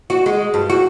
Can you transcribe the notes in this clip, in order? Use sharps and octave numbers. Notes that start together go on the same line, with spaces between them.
F#4
G#3
G2
F#4